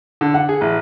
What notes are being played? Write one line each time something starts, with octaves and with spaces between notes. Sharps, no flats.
D3
F#5
G#4
A1